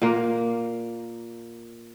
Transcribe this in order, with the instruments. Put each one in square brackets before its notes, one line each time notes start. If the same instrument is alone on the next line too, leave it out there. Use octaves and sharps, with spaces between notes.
[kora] A#2 A#3